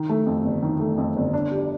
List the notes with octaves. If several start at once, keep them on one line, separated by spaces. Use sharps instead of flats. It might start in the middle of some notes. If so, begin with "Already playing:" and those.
Already playing: D#3
A3
F2
G1
D#3
A3
F2
G1
D4
G4